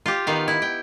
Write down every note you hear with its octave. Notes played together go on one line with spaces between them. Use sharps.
F4 G4
D#3 B3 F5
E4
G5